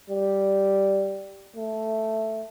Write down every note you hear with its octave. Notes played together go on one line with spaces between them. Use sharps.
G3
A3